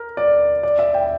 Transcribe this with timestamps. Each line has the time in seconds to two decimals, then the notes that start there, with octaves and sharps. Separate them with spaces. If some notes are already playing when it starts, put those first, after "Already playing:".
Already playing: A#4
0.17 D5
0.63 D5
0.79 E5
0.94 G5